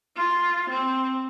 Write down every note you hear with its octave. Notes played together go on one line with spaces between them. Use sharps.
F4
C4